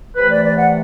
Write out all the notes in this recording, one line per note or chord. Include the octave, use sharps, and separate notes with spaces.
C3 E3 A3 B4
D5
D5
F#5